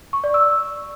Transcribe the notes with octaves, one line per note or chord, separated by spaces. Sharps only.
C#6
D5
E6